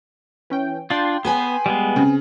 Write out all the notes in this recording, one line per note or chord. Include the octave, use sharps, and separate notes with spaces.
E3 C#4 G5
D4 F4 G5 C6
B3 G#4 B4 G#5
G3 G#3 B3
C#3 C4